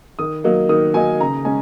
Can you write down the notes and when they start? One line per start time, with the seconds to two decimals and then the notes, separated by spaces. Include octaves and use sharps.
0.19 D#3 D#6
0.44 F#3 A#3 D#4
0.69 D#3 D#6
0.94 F#3 A#3 D#4 G#5
1.20 C#3 A#5
1.45 G#3 C#4 G#5